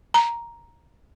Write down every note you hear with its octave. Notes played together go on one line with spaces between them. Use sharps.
A#5